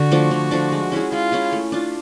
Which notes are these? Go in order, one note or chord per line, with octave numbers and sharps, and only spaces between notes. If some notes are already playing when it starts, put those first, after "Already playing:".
Already playing: D3 F#4
F3 A3 D4
D3
F3 A3 D4
G#3
C#4 E4 G#4
G#3 F4
C#4 E4 G#4
A3
D4 F4